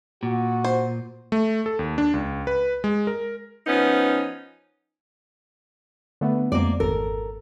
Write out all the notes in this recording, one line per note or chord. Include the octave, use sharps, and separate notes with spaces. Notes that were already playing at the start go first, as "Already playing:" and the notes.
A#2 F#4
C5
A3
A4
D#2
D4
C#2
B4
G#3
A#4
F3 B3 C#4 D#4
D3 A3 B3
F2 G#3 A#3 D5
G#1 A4 A#4